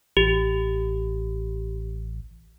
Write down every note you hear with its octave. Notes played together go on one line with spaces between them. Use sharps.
A1 G4